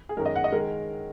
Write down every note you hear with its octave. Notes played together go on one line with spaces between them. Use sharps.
G#4
F#2 D#3 G#3 A#4
D#5
F#5
D#5
D#3 G#3 A#4